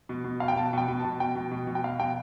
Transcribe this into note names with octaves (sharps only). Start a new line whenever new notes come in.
B2
B2
B2 F5
G5
B2 A5
B2 G5
B2
A5
B2
B2 G5
B2
B2
B2
G5
B2 F5
B2 G5